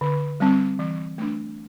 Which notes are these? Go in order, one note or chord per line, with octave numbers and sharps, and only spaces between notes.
D3
G3 C4
E3
A3 D4